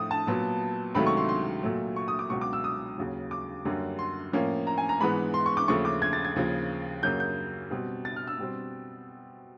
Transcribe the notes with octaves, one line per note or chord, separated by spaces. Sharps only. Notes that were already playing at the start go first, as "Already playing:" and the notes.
Already playing: A2 F3 A3 D#6
A5
A#2 F#3 B3
C#2 C3 D#3 F#3 A3 B5
C#6
C6
C6
A#2 F#3 A3
C#6
D#6
D6
C#2 B2 F#3 C#6
D6
E6
D#6
D#2 C#3 F#3
D6
F#2 D3 G3 A#3 C#4
C6
A2 F3 A#3 C#4
A#5
G#5
A#5
G#2 E3 G#3 B3 B5
C6
C#6
D6
D#2 C#3 F3 A3 C#6
D6
G#6
A6
G#6
D#2 C#3 F3
F#2 C#3 F#3 A#3 C#4 G6
G6
B2 G3 C4
A6
F6
E6
B2 G3 C4